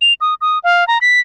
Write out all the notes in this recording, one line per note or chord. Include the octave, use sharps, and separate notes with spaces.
F7
D#6
D#6
F5
A#5
B6